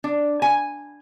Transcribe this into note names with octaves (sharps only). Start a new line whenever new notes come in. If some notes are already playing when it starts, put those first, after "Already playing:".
D4
G#5